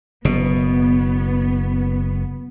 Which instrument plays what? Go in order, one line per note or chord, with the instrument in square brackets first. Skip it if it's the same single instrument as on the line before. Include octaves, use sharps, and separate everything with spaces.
[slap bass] F#1 B2 [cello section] B3